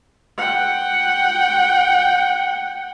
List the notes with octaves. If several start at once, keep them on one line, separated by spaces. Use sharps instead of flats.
F#5 G5